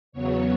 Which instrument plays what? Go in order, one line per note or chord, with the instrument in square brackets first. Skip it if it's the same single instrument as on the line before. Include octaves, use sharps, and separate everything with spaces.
[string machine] E2 C#3 F#3 B3 C#5